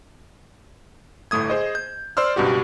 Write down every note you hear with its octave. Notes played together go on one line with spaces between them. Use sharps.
G1 A2 A3 D#6 G#6
G#4 C5 D#5
G6
C5 D5 C6 E6 F6
C#2 G2 B2 F#4 G4